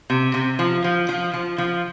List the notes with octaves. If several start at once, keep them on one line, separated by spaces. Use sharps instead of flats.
C3
C3
F3
F3
F3
F3
F3